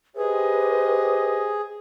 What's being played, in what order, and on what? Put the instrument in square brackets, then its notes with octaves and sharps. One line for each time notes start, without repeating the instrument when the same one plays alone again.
[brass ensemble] G4 C5 D#5 [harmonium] G#4 [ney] B4